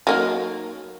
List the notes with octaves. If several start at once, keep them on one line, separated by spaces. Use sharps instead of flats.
F#3 A#3 D#4